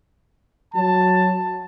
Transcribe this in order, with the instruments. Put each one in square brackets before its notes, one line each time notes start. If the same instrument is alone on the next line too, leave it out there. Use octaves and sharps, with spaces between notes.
[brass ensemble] F#3 A5